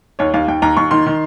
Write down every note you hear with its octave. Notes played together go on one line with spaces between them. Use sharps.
D#2 C#5
D#2 F5
D#2 G5
D#2 A#5
D#2 C#6
D#3 C6
D#3